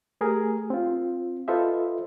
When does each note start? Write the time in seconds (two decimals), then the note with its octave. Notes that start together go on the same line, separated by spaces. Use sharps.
0.21 A3 G4 G#4 A#4
0.70 C4 F4
1.48 F4 A4 B4 C5 D#5 E5